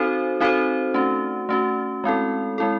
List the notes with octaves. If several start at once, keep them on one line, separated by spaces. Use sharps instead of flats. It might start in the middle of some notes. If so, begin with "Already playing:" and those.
Already playing: C4 D#4 F#4 A4 C5
C4 D#4 F#4 A4 C5
A3 C#4 F#4
A3 C#4 F#4
G#3 C4 E4 A4
G#3 C4 E4 A4